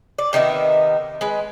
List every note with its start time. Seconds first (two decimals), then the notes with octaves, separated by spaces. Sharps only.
0.18 D5
0.33 C3 D#3 B3 E5
1.21 G#3 B4